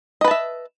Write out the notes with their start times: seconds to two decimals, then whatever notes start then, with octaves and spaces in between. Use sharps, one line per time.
0.21 D#5
0.24 B4
0.28 A5
0.31 E5